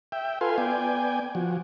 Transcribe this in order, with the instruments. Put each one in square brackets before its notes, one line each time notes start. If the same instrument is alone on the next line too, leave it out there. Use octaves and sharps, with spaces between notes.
[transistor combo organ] E5 G5
F4 A4 B4 F5 G#5 C6
B3 D5 G5 G#5
F3 F#4